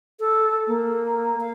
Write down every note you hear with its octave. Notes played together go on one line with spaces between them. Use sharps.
A4
A#3
F5